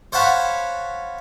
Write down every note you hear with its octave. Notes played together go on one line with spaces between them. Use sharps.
C5 C#5 F5 F#5 A5 B5